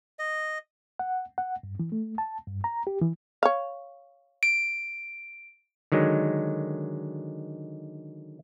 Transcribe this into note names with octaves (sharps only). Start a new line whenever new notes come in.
D#5
F#5
F#5
G2
E3
A3
A5
G2
A#5
G4
E3
C#5 F5
D7
D3 D#3 F#3 G#3